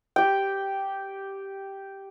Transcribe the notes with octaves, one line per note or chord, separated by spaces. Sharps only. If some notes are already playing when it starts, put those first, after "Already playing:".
G4 G5